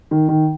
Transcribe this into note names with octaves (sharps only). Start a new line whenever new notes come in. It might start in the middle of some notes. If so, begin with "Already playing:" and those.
D#3
D#3